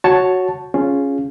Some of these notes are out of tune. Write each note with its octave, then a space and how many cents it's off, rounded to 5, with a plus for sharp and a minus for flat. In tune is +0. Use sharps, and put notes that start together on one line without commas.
F#4 +0 C#5 +0 A5 +0
C#4 +0 F4 +0 G#4 +0